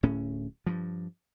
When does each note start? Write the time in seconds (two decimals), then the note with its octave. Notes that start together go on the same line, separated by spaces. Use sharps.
0.03 D1 A2 C#4
0.66 G2 F3